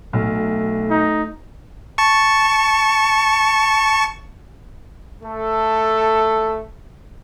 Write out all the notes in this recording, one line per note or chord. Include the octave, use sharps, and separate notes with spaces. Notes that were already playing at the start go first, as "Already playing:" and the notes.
B1 A3
D#4
A5 C#6
A3 A4